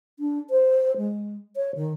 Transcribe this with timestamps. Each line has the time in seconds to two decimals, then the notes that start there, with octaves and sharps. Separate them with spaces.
0.19 D4
0.50 C5
0.97 G#3
1.56 C#5
1.75 D#3